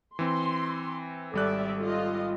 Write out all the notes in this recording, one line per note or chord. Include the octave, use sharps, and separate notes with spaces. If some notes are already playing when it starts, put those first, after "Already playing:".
E3 C4 C6
G#1 G3 A4 D5 E5 F#6
F4 A4 D#5